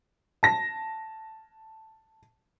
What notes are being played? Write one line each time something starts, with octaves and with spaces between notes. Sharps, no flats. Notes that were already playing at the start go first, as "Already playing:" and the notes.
A5 A#6